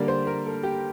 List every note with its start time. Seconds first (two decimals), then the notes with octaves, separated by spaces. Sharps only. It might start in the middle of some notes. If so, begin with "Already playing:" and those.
Already playing: D3 G3 A#3 D5
0.08 C5
0.27 A#4
0.46 A4
0.63 G4